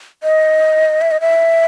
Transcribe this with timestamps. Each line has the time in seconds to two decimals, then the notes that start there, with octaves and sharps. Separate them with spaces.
0.23 D#5
1.01 E5
1.11 D#5
1.21 E5